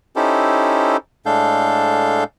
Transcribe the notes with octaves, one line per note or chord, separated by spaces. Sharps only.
C#4 D#4 E4 G4 A4 C5
A2 G#3 D4 A4 F5 G6